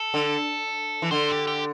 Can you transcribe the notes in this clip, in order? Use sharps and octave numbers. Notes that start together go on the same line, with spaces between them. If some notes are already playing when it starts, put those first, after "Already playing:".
Already playing: A4
D3
E3
D3 C5
G4
G4